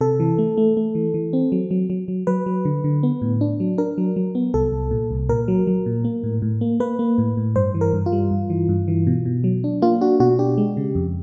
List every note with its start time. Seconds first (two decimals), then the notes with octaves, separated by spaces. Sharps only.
0.01 C3 A4
0.20 E3
0.38 A3
0.57 A3
0.77 A3
0.95 E3
1.14 E3
1.33 C4
1.52 F#3
1.71 F#3
1.90 F#3
2.08 F#3
2.27 F#3 B4
2.46 F#3
2.65 D3
2.84 D3
3.03 B3
3.22 A2
3.41 D4
3.60 F#3
3.78 D4 A#4
3.98 F#3
4.16 F#3
4.35 B3
4.54 C2 A4
4.72 C2
4.91 A#2
5.11 C2
5.29 A#2 A#4
5.48 F#3
5.67 F#3
5.86 A#2
6.04 A#3
6.24 A2
6.42 A2
6.61 A#3
6.80 A#3 B4
6.99 A#3
7.18 A2
7.37 A2
7.56 G2 C5
7.74 E3
7.81 A#4
7.93 G2
8.06 F4
8.12 G3
8.31 G2
8.50 E3
8.69 G2
8.88 E3
9.07 B2
9.25 B2
9.44 F#3
9.64 D4
9.82 A#3 F4
10.01 D4 F#4
10.20 B2 F#4
10.39 D4 G4
10.58 G#3
10.77 C#3
10.95 F2